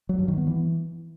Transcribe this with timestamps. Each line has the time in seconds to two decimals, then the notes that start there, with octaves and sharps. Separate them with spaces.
0.09 F#3
0.19 G2
0.28 D#3
0.37 B3
0.47 E3